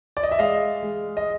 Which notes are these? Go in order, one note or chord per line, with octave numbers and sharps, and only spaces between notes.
D5
D#5
E5
G#3 D#5 F5
G#3
D#5